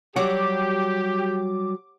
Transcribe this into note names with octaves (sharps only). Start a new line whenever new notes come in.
F#3 G3 G4 F#5 D6